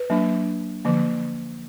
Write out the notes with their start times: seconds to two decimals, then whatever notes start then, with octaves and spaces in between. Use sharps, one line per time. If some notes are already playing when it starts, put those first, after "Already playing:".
Already playing: B4
0.10 F#3 A#3 D4
0.85 D3 F3 A#3